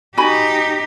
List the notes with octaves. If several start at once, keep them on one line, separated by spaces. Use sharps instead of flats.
D#4 F#4 G4 G#5 B5